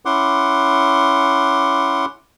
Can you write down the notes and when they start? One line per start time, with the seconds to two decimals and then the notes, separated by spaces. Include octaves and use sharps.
0.05 C#4 E4 F#5 C6 D6